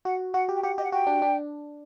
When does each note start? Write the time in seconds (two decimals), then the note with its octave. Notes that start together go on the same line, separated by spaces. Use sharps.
0.05 F#4 F#5
0.33 F#4 F#5
0.49 G4
0.56 G5
0.63 G4 F#5
0.78 G4 D#5
0.84 F#5
0.92 F#4 G5
1.07 D4
1.22 D4